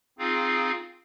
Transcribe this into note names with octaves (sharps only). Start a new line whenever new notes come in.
C4 D#4 F4 G#4 F5